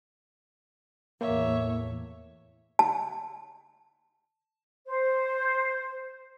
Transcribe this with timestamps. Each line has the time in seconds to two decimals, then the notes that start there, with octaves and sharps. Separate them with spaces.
1.21 E2 A2 A#3 C#5 E5
2.79 A5
4.87 C5